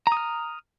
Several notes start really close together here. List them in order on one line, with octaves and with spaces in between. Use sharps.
A#5 D#6 F6